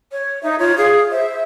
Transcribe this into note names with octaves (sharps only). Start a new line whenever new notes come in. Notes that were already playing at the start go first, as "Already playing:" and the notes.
C#5
D#4 E5
F4 C#5
G#4 F5
C5 E5